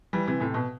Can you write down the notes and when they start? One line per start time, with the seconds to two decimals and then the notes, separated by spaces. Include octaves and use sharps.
0.13 E3 G3
0.27 C3 E3
0.40 A2 C3
0.54 B2